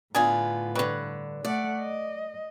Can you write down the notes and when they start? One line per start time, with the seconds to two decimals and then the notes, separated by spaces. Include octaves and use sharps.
0.15 A2 D3 B3 D4 F4 G#4
0.75 G2 D3 G3 B4 C#5
1.45 A3 D5 F#5
1.80 D#5